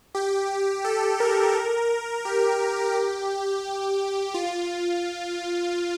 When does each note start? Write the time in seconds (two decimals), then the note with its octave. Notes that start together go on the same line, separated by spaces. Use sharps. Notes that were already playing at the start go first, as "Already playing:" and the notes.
0.15 G4
0.84 A4
1.20 A#4
2.25 G4
4.34 F4